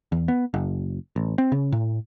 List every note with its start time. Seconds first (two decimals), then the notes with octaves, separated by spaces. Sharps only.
0.12 E2
0.28 B3
0.54 F#1
1.16 A1
1.38 C4
1.52 C#3
1.72 A2